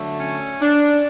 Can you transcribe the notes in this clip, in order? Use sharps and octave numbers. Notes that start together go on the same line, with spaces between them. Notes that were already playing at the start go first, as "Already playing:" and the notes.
Already playing: D3 F#3 A3
C#4
D4